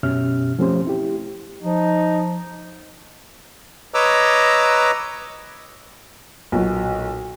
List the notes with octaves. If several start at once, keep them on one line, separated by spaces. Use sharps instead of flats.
F#2 B2 C#4 G4 E5 F6
F3 A3 C4 C#4 G4 C5
E4 G4
F3 D#4
B4 C#5 D#5 A#5 D6 E6
B1 A#2 F#4